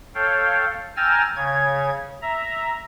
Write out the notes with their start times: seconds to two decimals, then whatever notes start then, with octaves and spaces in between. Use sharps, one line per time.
0.15 A4 C#5 F5 G5
0.97 G5 G#5 A#5 E6 F6 A6
1.36 C#3 C#5 G#6
2.22 E5 A#5